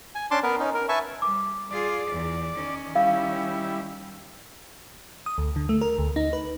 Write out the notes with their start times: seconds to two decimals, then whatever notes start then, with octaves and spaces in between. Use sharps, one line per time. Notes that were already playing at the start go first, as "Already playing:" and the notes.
0.15 G#5
0.31 C#4 D4 A5 C6 D6
0.43 B3 A#4 B4
0.60 C#4 D#4
0.74 A#4
0.89 B4 E5 G#5 A5 C#6
1.22 G3 D6
1.71 F4 G#4 D5
2.10 E2
2.54 D#3 C#4
2.95 G3 E4 F5
5.26 D#6
5.38 D2
5.56 D3
5.69 A3
5.81 A#4
5.99 D2
6.16 D#4
6.33 B4